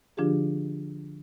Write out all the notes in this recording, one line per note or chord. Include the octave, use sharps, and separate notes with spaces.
D3 F3 D4 F4 G4 G#4